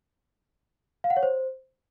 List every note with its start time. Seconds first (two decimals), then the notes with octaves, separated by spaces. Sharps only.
1.04 F5
1.10 F#5
1.17 C#5
1.23 C5